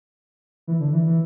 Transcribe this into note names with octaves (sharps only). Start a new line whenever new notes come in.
E3
D3
E3
E3